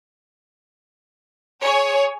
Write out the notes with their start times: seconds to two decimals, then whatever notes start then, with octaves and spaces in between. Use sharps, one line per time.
1.62 G#4 C#5